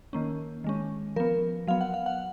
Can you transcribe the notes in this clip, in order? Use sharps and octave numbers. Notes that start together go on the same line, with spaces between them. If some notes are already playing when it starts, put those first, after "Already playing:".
D#3 A#3 C#4
D#3 G#3 C#4
F3 B3 A#4
F#3 B3 F5
F#5
F5
F#5